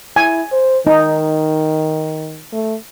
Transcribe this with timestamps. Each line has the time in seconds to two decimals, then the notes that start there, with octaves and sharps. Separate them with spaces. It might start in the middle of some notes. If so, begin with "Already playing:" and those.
0.16 E4 G#5
0.52 C5
0.87 D#3 D#4
2.52 A3